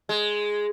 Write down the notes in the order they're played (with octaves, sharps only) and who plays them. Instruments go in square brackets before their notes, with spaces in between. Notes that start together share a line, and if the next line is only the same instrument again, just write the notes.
[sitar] G#3